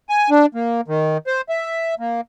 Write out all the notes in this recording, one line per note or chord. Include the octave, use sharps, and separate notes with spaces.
G#5
D4
A#3
D#3
C5
E5
A#3